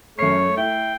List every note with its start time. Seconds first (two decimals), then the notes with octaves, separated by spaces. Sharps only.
0.19 F#2 A3 C#5 C7
0.57 E4 G5